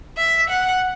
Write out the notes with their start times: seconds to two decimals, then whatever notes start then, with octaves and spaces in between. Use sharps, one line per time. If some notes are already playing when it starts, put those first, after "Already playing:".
0.18 E5
0.50 F#5